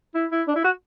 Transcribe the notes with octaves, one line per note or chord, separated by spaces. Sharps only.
E4
E4
D4
E4
F#4